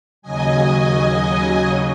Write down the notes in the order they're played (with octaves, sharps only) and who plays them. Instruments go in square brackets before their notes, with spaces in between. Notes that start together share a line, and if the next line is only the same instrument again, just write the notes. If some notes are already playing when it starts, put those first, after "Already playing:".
[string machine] D#2 C#3 F#3 D#5 G#5